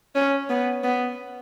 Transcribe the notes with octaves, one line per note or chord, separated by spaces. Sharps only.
C#4
B3
B3